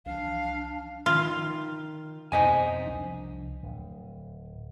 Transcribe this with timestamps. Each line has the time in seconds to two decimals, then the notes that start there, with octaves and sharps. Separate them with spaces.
0.06 C2 E3 F3 D4 F5
1.06 D#3 F4
2.32 F2 B2 C4 C5 D#5 G#5
2.87 C2 F3 D4
3.63 D1